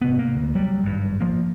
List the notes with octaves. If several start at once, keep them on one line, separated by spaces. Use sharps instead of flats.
G#1 C3 B3
A#3
D2
F#3 G3
G#1 G2
F3 A#3